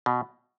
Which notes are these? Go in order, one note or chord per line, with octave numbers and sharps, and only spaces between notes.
B2